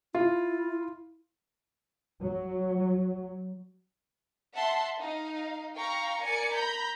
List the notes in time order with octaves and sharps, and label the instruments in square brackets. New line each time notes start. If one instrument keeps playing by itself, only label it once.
[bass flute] E4 [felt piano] F4
[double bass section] F#3
[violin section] E5 F#5 A5 C6
D#4 F5
F5 G5 A#5 C#6
A#4 D5 G#5 C#7
A#5 B5 G6